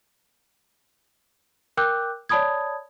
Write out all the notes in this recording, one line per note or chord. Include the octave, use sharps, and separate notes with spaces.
A#4 G5 D6 E6 F#6 G6
C#5 D5 A5 B5 D#6 G#6